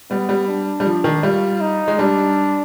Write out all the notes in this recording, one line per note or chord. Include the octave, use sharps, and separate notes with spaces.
G3 B3
G3
D4
G3
F3
D#3
G3 F4
D#4
G#3
G3 D4